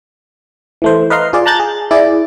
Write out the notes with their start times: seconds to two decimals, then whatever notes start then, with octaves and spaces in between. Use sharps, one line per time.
0.82 E3 A3 C5
1.10 B4 D#5 F5 A#5 C6
1.33 F4 G#4 D5
1.46 A5 A#5 F#6 G6 A6
1.60 G#4
1.91 E4 G#4 D5